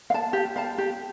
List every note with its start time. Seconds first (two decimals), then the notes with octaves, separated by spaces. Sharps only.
0.10 F5
0.14 A5
0.33 G4
0.56 F5 A5
0.78 G4